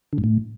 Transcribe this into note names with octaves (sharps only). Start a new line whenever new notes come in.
D3
G#2
A2